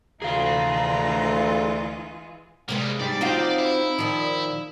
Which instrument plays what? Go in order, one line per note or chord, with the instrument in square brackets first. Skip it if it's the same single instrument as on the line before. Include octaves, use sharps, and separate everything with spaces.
[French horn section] D2 [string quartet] E3 G#3 F4 [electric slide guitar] G#4 F5 [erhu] A#5
[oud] C3 G#3 B4 [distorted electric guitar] G3 A#3
[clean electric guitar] G#2 G3 [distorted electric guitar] D5
[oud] C4 F4 F#4 [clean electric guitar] D#4 F5 G5
[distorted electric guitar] E4
[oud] A#2 D#3 F3